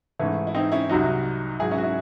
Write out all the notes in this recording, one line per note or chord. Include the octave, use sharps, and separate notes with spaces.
G#2 E3 A3 C#4
E4
C4 D#4
C#4 E4
C2 C3 F#3 D#4 F#4
G#2 F#3 E4 G#4
C#4 E4
F#4
C#4 E4